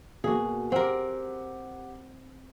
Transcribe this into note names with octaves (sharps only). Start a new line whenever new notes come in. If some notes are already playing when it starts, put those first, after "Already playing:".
B2 A#3 F#4 G#4
C4 G4 A#4 F#5